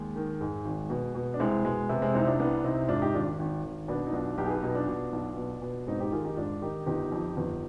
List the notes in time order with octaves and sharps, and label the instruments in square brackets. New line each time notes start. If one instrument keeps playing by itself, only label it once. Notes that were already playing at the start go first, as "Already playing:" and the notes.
Already playing: [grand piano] D#2 G#3
D#3
G#2 G#3
G#1
B2
B2
D4
C2 G#3 C4
B2 G#3
C3 B3
G#3 C4
C2 C4 D#4
D4 F4
C2 B3 D4
C3 C4 D#4
G#2 D4 F4
D#4 G4
G#1 D4 F4
G#1
G#1
B2 B3 D4
D#4
B1 D4 F4
B1 D#4 G4
G#4
G4 B4
B2 D#4 G4
D4 F4
B2
B1
B2
B2
G#2 C4 D#4
D#4 G4
D#3 F4 G#4
D#4 G4
G#2 D4 F4
D#3 D#4 G4
G1 D#4 G4
F2
G1